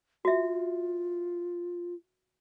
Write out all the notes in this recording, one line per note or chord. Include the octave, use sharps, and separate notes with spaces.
F4 F#4 E5